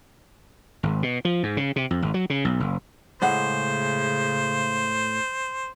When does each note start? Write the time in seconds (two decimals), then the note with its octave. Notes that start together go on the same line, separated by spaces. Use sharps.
0.83 G#1
1.03 B2
1.25 F3
1.43 G#2
1.57 C#3
1.76 C3
1.91 F2
2.02 G#1
2.14 F#3
2.30 C#3
2.45 B1
2.60 F#1
3.22 A2 C#3 G#3 C5 F#5